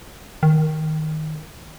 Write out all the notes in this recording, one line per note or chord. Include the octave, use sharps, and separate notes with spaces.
D#3